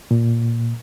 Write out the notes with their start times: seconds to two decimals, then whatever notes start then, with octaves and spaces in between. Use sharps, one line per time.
0.11 A#2